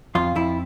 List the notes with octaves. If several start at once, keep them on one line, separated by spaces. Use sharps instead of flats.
F2 F4
F2 E4